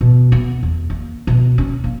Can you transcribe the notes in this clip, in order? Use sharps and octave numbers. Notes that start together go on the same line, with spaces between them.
B2
B3
E2
A#3
B2
C#4
A#3